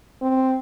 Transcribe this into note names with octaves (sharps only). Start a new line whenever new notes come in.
C4